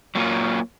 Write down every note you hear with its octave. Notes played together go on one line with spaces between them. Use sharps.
F#3 A#3 F4